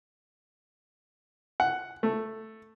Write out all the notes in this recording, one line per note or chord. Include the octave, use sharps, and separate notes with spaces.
F#5
A3